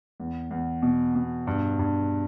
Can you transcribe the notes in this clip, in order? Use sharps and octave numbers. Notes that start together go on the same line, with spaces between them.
E2
E2
B2
B2
G2
G2